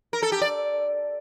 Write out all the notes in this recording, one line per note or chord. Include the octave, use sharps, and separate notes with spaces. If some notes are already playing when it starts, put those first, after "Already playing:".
A#4
A4
G4
D5